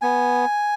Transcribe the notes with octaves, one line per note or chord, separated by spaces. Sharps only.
B3 G#5